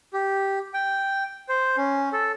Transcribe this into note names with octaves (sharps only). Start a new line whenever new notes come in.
G4
G5
C5
C#4
A4